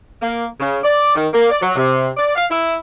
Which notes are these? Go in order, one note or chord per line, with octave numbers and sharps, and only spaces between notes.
A#3
C#3
D5
D#3
A#3
D5
F#3
C3
D5
F5
E4